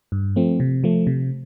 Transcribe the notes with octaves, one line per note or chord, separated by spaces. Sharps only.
G2
F3 A3 C4
C3
F3 A3
C3